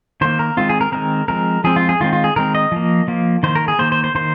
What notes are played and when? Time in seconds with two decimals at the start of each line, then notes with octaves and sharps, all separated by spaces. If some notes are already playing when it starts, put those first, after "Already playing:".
0.21 D#3 A#3 C5
0.39 A#4
0.57 D#3 G#3 C4 F4
0.69 G#4
0.81 A#4
0.92 D#3 G#3 C4 A#4
1.28 F3 G#3 C4 A#4
1.64 F3 G#3 C4 G#4
1.76 F4
1.89 G#4
2.00 D#3 G#3 C4 F4
2.13 F4
2.24 G#4
2.36 D#3 G#3 C4 A#4
2.55 D#5
2.72 F3 A#3
3.08 F3 A#3
3.43 D#3 A#3 C5
3.55 A#4
3.68 G#4
3.79 D#3 A#3 C5
3.92 C5
4.04 C5
4.15 D#3 A#3 C5